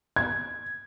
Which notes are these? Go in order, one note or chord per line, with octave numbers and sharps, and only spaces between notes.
G#6